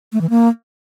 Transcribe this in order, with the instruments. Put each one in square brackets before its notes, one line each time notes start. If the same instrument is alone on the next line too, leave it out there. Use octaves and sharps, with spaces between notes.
[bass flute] A3
E3
A#3